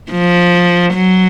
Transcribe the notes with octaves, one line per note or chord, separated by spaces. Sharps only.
F3
F#3